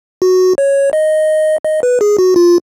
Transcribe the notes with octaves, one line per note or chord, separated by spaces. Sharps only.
F#4
C#5
D#5
D#5
B4
G#4
F#4
F4